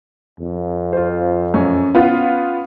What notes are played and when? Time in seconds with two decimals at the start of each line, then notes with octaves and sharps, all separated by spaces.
0.40 F2
0.93 F4 C5
1.54 F#2 C#4
1.95 B3 F4